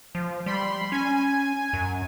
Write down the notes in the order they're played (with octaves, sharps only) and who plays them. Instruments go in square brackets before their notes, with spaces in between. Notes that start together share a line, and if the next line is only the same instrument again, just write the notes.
[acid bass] F3
[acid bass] G3 [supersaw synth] B5 C6
[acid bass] C#4 [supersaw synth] G#5
[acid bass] F#2